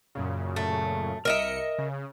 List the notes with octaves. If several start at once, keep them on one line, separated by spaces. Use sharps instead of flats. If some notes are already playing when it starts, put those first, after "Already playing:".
F#2 A#2 C#3
A3
C2 A#4 D#5 E5 C#7
C#3